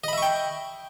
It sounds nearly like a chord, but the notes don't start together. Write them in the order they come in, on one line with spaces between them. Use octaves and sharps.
D#5 B5 E5 C#6 G5